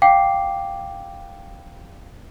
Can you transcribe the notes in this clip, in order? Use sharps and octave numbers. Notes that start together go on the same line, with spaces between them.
F5 G5 D6 C7